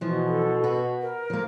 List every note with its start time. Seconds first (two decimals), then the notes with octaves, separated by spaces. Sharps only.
0.01 B2 E3 F3
0.28 A4
0.64 F#4 B4
1.02 A#4
1.30 F3 A#3